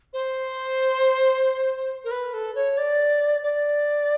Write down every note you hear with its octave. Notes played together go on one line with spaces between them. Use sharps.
C5
A#4
B4
A4
C#5
D5
D5